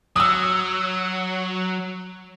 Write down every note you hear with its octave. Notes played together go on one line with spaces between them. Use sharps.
F#3 D#6 E6